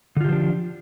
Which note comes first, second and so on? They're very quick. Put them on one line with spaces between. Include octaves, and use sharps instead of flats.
D3 F4 G4 F3 D4